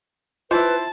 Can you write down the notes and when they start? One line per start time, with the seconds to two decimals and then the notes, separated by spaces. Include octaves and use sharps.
0.51 E4 F4 B4 C5 A5